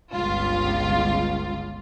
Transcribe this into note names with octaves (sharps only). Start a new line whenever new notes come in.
G1 C#2 F4